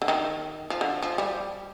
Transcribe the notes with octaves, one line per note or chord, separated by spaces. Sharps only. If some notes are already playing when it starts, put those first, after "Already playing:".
D3
D#3
F3
D3
F3
G3